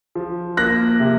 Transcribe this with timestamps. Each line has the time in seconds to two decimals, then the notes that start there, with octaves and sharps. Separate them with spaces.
0.15 F3
0.57 A#3 F#6 A#6
1.00 C3